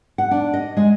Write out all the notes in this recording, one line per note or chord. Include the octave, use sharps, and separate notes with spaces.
F#5
D4
D#5
G#3